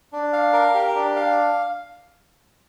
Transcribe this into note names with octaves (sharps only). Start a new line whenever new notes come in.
D4
F5
A#4
G4
D4
F5